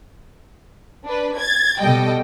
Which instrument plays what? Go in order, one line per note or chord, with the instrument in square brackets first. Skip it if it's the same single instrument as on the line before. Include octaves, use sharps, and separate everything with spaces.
[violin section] D4 B4
G#6 A6
[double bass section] B2 G3 [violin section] A4 D#5 G5